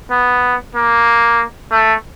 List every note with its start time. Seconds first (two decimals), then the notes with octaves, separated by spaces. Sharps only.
0.11 B3
0.75 A#3
1.71 A3